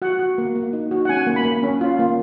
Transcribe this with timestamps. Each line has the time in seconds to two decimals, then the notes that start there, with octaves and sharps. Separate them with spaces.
0.02 F#4 F#5
0.19 F#4
0.38 A#3
0.55 A#3
0.73 D#4
0.91 F#4
1.05 F#5
1.09 C#4 G#5
1.27 A#3
1.36 B5
1.45 A#3
1.63 C#4
1.81 F4
1.99 A#3